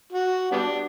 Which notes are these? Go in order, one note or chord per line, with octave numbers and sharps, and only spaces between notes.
F#4
G3 B3 D4